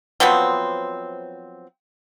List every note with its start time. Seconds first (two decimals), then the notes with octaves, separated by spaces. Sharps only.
0.20 F3 F#3 B3 C4